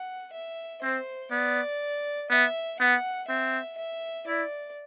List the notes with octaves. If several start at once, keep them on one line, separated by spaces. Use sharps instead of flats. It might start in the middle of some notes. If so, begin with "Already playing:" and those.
Already playing: F#5
E5
C4 C5
B3 D5
B3 E5
B3 F#5
C4 E5
E5
E4 D5